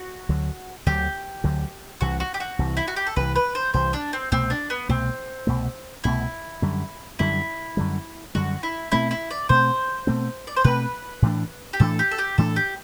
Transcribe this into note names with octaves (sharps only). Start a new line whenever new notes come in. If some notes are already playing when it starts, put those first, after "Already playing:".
Already playing: F#4
D2 D3 F#3
D2 D3 F#3 G4
D2 D3 F#3
C2 C3 E3 F#4
F#4
G4
F#4
C2 C3 E3
E4
F#4
G4
A4
C2 C3 E3 B4
B4
C5
C2 C3 E3 C5
D4
C4
C2 B2 A3 C4
D4
B3
C2 B2 A3 C4
C2 B2 A3
C2 B2 A3 E4
F#2 D3 G3
F#2 D3 G3 E4
F#2 D3 G3
F#2 D3 G3 F#4
E4
B2 A3 C4 E4
E4
D5
B2 A3 C4 C5
B2 A3 C4
D5
C5
B2 A3 C4 B4
A2 E3 A3 D4
G4
A2 E3 A3 D4 A4
G4
A4
G4
A2 E3 A3 D4 A4
G4